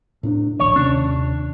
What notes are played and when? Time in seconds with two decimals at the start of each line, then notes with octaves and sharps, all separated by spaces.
0.23 A2 C#4 D4
0.59 A#1 D#2 C#5
0.76 D#2 C3 C#4 D4